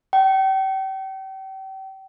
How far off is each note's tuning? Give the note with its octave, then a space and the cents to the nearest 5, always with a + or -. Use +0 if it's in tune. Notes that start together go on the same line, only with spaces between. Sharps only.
G5 -35